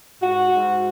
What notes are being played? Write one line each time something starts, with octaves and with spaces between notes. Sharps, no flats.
G#2 F#4
G#2